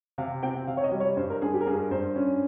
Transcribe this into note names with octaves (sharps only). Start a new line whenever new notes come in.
C3 F5
C4 G5
C3 F5
C#5
D#5
G3
C#5
G2 C5
A#4
G2 G#4
G4
A#4
G2 G#4
G2 C5
C#4